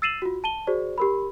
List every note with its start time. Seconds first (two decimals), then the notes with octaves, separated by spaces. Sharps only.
0.02 E6 A6 C7 D#7 E7 F#7
0.22 F4 F#4
0.44 A5 D#7 G7
0.67 F#4 G#4 C5 D5
0.98 G4 A#4 B5